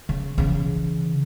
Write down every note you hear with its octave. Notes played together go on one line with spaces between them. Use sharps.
C#3
C#3 E3